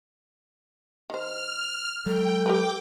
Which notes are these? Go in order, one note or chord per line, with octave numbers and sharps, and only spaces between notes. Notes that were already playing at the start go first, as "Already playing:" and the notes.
D#3 C5 F6
F#3 G#3 A4 G5
G4 A#4 B4 G5 D6